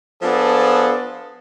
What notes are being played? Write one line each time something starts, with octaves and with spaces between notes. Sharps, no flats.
F3 B3 D4 F4 G#4 A4